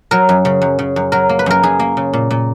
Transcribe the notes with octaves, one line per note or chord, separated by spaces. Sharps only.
F#3 A#4
F#2
C#3
F#2
C#3
F#2
F#3 A#4
A#3
B4
F#2 A#4
F#2 G#4
A#3
C#3
A#2
A#2